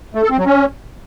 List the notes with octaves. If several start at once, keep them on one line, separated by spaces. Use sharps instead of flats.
A3
A4
C4
F#3
C#4